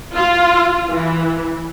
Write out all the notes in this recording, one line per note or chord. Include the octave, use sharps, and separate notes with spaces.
F4
E3